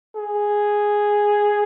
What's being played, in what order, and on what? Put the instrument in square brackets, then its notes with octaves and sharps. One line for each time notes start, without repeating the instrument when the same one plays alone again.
[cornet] G#4